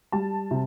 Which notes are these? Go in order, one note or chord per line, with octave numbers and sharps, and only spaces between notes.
G3 A5
C3